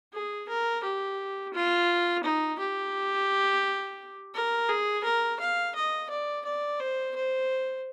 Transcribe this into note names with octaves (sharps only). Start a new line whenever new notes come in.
G#4
A#4
G4
F4
D#4
G4
A#4
G#4
A#4
F5
D#5
D5
D5
C5
C5